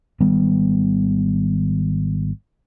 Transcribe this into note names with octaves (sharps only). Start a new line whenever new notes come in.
G#1 D#3 G3 B3